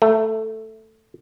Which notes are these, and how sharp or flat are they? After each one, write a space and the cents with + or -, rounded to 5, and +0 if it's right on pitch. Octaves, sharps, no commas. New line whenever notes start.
A3 +5